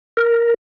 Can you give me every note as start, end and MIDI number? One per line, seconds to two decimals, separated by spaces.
0.17 0.54 70